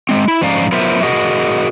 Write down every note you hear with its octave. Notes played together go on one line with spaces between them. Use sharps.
G#3 C4
E4
G#2 F3 C#4 D5 F5 A#5
F#3 B3 F4 A#4 C5 E5
F#4 G#4 A#4 D#5 F#5